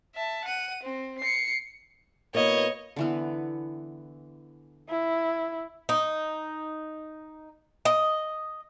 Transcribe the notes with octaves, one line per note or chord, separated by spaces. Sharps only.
E5 A5
F#5 D#7
C4
C7 C#7
B2 A#3 E4 C#5 D#5
D3 E3 B3
E4
D#4
D#5